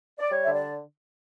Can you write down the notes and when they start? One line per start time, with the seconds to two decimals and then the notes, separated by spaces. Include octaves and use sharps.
0.19 D5
0.30 G3 C#5
0.44 D3 E5
0.54 D5